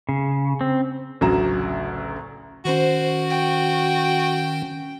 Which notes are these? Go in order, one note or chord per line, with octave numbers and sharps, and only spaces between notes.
C#3
C4
A1 D2 C#3 F#3 A#5 E7
D#3 C#4 F#4 C5
G5